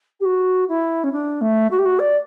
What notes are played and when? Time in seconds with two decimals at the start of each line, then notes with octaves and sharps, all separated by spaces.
0.20 G4
0.25 F#4
0.68 E4
1.03 C#4
1.12 D4
1.41 A3
1.70 F#4
1.78 G4
1.85 F#4
1.99 D5